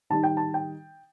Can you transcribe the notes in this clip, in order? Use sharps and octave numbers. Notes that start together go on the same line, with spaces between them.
D#3 G3 D#4 A5
G5
A5
G5